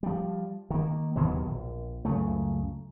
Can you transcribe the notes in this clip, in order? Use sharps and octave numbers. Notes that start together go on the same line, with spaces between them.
F3 G3
D#3 A#3
D#2 B2 D#3 F#3
A#1
C#2 F#2 C#3 A3